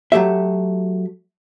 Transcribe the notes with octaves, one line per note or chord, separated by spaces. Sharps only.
F#3 A3 G4 E5